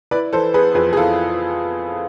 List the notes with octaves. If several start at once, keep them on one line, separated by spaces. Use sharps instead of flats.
E4 B4 D5
E3 A4 C5
B3 G#4 B4
F2 G#4 B4
G#4
E4 F4 A4